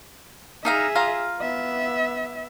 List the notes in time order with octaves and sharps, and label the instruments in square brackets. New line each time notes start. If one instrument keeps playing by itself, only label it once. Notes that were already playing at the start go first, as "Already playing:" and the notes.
[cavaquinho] D#4 F5 A#5 [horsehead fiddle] G#4 E5
[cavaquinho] F4 F5 A#5
[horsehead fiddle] B3 E5